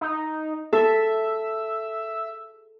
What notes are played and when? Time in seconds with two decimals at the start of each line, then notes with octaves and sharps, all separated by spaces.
0.01 D#4
0.73 A4 E5